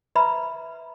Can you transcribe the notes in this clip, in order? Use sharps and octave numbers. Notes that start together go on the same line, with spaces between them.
B4 E5 A#5 B5